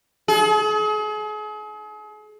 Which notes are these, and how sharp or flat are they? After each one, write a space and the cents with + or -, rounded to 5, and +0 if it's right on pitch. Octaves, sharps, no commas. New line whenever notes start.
G#4 +40